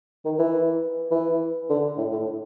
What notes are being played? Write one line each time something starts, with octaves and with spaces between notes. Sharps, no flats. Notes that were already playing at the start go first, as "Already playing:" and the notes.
D#3
E3
E3
D3
A2
A2